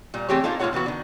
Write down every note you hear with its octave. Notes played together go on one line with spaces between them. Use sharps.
A#2 G3
E3 A3 C4 G4 G#4 C#5
A#3 D#4 F4 G#4 A4
A2 A#3 F4 A4 C#5 F#5
A#2 E3 B3 F#4
D#3 D4